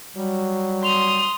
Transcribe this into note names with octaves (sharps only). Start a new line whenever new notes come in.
F#3 G3
C6 D#6 F7